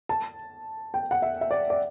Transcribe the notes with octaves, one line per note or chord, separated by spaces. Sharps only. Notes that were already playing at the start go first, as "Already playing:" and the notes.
A5
G5
F#5
E5
E5
D5
D5